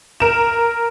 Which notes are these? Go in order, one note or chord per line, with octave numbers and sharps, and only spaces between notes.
A#4 E7